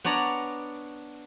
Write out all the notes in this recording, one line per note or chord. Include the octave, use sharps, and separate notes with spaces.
B3 D4 C#5 D5 A#5